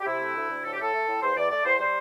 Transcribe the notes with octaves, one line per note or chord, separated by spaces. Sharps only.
G4
C3 E4
A3
D2
D2
A2 A4
G4
A2 A4
A3
A2
E2 C5
E2 D5
A3 D5
E2 C5
G3 C5